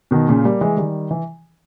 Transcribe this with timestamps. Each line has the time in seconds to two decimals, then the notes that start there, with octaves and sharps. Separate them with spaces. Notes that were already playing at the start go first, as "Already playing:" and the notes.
0.11 B2 D#3
0.28 A#2 C#3
0.44 G3 A#3
0.61 E3 G#3
0.77 D#3 G3
1.11 E3